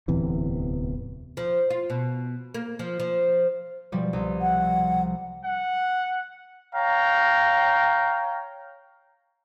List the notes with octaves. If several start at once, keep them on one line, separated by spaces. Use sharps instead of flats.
D1 E2 C3 E3
F3
F4
B2
A#3
F3
F3
B2 F3 G3
C2
F#5
F#5
C#5 F5 G5 A#5